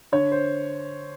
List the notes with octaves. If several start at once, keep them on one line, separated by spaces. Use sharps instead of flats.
D3 C#5
C5